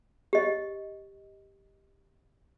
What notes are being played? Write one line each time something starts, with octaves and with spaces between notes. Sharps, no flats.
G4 D#5